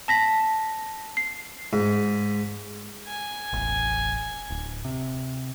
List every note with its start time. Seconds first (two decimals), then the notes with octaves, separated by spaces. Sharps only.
0.08 A5 A#6 B6
1.17 C7
1.73 G#2
3.07 G#5
3.53 E1 A1
4.50 D1
4.85 C3